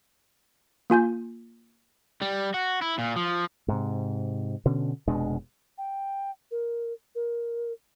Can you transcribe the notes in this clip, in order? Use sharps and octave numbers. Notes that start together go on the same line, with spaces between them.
A#3 F4 G#5 G6
G3
F#4
E4
A#2
F3
G#2 C3
B2 D3 C#4
F1 B2 G#3 D4
G5
A#4
A#4